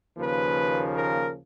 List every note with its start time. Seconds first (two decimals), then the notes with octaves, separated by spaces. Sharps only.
0.17 D#2 C#3 F3 A#3 B4
0.93 A#4